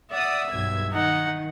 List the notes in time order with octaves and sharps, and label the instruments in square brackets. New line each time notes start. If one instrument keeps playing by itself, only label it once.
[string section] D5 F#5 D#6 [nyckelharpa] E5
[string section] B1 G2 G#6
[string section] D#3 [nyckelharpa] D#4 F#5